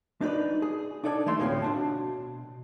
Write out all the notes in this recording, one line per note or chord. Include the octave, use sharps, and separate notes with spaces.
D4 D#4 G4 B4 D5
G#4
D4 D#4 A4 D5 F5 G#5
E3 G#3 A3 C6
D2 A2 F3 A#3 C4 C#4
B2 D4 A5